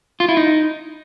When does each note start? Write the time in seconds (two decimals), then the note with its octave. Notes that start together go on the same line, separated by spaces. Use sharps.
0.20 F4
0.29 E4
0.37 D#4